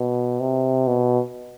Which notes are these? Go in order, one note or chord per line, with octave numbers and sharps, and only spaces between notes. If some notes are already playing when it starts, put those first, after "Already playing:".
Already playing: B2
C3
B2